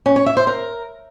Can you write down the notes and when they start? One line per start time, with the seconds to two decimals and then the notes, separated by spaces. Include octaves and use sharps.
0.06 C#4
0.16 C#5
0.26 E5
0.37 C5
0.47 A#4